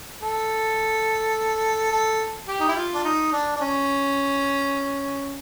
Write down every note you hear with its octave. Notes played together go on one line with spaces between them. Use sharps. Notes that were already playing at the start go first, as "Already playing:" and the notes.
A4
A4
G4
D#4
E4
F4
D4
D#4
D4
D4
C#4